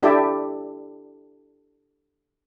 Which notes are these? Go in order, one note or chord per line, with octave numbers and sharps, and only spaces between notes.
D4 E4 G4 A4 D5 E5